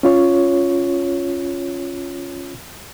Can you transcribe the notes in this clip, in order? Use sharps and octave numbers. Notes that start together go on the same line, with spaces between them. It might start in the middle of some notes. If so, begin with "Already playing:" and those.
C#4 F4 C#5